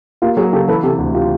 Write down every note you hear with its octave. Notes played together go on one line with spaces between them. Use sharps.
A#3 F4 G4
F#3 F#4 G#4
C#3 G4 A4
E3 A4 B4
C3 G4 A4
D2
F4 G4